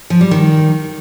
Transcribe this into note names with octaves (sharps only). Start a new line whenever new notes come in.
F3
G3
D#3